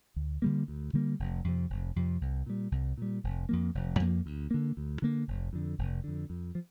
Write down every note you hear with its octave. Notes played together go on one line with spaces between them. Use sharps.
D2
D3 G3 A#3
D2
D3 G3 A#3
F1
F2 C3 F3
F1
F2 C3 F3
C2
A#2 G3
C2
A#2 G3
F1
F2 F3 A#3
F1
F2 F3 A#3
D2
D3 A#3
D2
D3 A#3
F1
F2 D3
F1
F2 D3
F2
F3